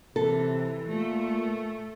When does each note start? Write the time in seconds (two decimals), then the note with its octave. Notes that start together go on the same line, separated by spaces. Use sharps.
0.16 C3 E3 A4
0.87 A#2 A3